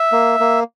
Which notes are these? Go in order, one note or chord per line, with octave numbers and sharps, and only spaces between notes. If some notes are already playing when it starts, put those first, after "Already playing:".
Already playing: E5
A#3
A#3